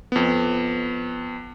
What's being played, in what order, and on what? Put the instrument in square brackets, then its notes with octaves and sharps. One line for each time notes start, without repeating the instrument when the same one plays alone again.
[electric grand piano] F2 B3